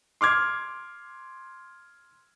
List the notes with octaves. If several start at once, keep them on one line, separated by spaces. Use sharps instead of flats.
C6 D6 F6 G#6